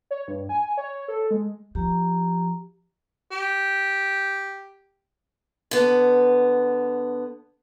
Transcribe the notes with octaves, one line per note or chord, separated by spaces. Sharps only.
C#5
G2
G#5
C#5
A4
G#3
F3 G4 A#5
G4
D3 B3